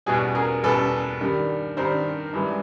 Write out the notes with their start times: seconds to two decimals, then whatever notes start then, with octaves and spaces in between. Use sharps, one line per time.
0.06 E2 B2 G3 F#4 G#4
0.35 G#4 A#4
0.63 E2 B2 G3 A4 B4
1.21 G2 D#3 G3
1.77 G2 D#3 G3 A#4 C5
2.33 G2 E3 G#3